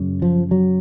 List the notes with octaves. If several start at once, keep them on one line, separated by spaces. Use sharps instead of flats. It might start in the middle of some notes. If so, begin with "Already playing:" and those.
Already playing: F#2 C#3
F3
F#3